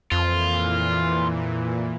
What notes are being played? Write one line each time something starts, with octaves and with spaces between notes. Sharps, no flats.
F2 A#2 E3 F4